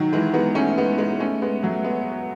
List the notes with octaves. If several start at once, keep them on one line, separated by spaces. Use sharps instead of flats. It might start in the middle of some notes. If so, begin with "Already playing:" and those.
Already playing: D#3 F#3
E3 G#3
G#3 B3
A3 C#4
G#3 B3
G#3 B3
A3 C#4
G#3 B3
F#3 A3
G#3 B3